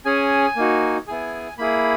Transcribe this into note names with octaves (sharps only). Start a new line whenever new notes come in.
C#4 G#4 G#5
A#3 D#4 F#4
B3 E4 G#4 G#5
A#3 E4 G#4 B5